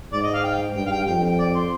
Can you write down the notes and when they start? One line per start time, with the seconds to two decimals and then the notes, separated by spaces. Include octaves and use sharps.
0.12 G#2 D5
0.23 D#5
0.33 F5
0.44 G5
0.75 G2 G5
0.86 F5
0.91 G5
1.07 F2 G5
1.23 G5
1.39 D5
1.55 C5